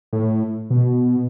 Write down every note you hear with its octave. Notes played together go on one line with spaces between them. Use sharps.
A2
B2